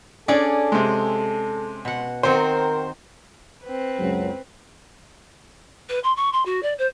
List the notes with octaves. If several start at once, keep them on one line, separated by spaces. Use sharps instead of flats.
C#4 D4 G#4 A4 D5
C3 G#3
B2 F#5
D#3 C4 F#4 A#4 C5
C4 B4
C#2 F#2 F#3
B4
C6
C#6
C6
F#4
D5
C5